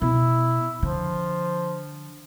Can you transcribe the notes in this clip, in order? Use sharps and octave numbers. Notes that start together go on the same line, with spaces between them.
B2 E4
D3 F3